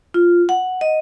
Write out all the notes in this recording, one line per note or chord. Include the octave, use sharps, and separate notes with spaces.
F4
F#5
D#5